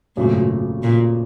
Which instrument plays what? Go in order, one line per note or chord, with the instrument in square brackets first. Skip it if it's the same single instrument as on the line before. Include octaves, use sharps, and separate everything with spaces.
[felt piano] G#1 F#2 C#3 F#3 A3 [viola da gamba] A#2
[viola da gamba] A#2